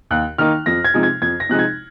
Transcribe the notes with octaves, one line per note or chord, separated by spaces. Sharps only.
D#2 F#6
D#3 A#3 D#4 F6
F2 A#6
G#6
C3 F3 G#3 D#4
G#6
F2 G#6
A#6
C3 F3 G#3 D#4 F#6
G#6